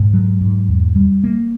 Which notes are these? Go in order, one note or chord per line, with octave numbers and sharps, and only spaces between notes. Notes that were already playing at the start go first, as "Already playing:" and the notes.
Already playing: G#2
F#3
G#2
E2
G3
A#3